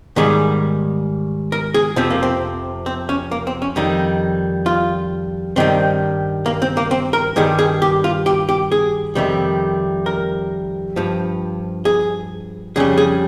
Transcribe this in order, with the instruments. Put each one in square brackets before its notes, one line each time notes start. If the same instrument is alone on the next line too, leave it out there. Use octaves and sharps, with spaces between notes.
[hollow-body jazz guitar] G#2 D#3 G3 G#4
A#4
G#4
F2 C3 F3 C4
A#3
C4
C4
C#4
A#3
C4
C#4
F2 D#3 G3 D#4
F4
G2 D#3 G3 C4
A#3
C4
A#3
C4
A#4
G2 D#3 G3 G#4
G#4
G4
F4
G4
G4
G#4
F2 C3 D#3 G3
A#4
G2 F3
G#4
F2 C#3 G3 G#4
G#4